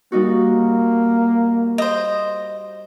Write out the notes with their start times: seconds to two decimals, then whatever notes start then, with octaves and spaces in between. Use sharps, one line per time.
0.12 G3 A#3 D#4 F#4
1.78 C5 D#5